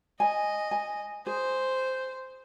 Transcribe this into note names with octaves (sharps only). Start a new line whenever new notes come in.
D#5 G#5
G#5
G#4 C5